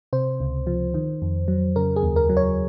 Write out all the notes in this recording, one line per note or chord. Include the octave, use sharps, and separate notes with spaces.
C3 C5
C#2
F3
D#3
F2
F#3
C#3 A#4
G#4
D#2
A#4
F#3
C#5